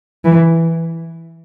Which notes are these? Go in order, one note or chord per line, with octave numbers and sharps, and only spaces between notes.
E3